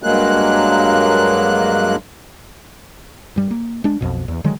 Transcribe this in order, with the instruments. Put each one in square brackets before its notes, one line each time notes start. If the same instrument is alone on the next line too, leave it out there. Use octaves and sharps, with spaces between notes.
[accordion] G2 F#3 G#3 A#3 F#6
[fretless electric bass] G2 G3
A#3
G#3 D4
B1 F2 B2
E2
D3 D#3 F#3 G#3